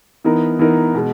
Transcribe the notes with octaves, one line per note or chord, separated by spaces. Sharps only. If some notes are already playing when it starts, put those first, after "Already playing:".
E3 B3 D#4 A#4
E3 B3 D#4 A#4
B2 G#3